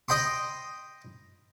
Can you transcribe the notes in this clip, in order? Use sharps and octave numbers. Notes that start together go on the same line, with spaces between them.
D#5 G5 B5 C6